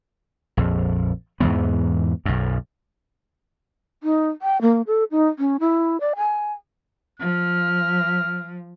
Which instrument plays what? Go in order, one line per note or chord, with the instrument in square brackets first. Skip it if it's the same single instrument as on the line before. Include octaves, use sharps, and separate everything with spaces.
[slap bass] A#1 F2
E2 G#2 E3 B3
B1 F#2
[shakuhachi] D#4
G5
A#3
A4
D#4
C#4
E4
D5
G#5
[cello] F3 [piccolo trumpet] F6